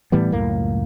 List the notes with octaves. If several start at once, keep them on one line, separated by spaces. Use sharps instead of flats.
A2 E3 G3 B3
C#2 F#2 A2 A#3